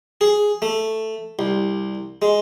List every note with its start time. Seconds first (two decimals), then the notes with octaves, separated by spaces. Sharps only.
0.21 G#4
0.62 A3
1.39 C2
2.22 G#3